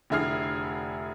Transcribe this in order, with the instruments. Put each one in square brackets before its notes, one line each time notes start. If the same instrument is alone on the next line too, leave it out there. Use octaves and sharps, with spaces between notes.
[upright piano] F1 D3 E4 G#4 F6 C7